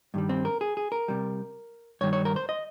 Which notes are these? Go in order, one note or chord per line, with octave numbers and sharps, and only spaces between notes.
G2 D#3 G3
C4
A#4
G#4
G#4
A#4
C3 G3
G2 D#3 G3 C#5
C#5
A#4
C5
D#5